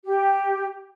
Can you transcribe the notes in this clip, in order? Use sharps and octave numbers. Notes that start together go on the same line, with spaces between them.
G4